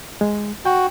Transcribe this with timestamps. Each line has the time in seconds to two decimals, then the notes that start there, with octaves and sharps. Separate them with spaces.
0.21 G#3
0.65 F#4 G5